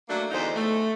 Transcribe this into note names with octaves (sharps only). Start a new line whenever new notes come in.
F#3 A3 A#3 D4
E2 D3 D#4 C5
A3